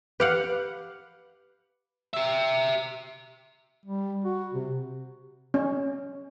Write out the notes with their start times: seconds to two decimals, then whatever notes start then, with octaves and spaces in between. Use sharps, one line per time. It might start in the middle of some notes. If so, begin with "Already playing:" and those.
0.20 G4 B4 F5 F#5
2.13 G4 E5
3.86 G3
4.24 F#4
4.53 C3
5.54 C#4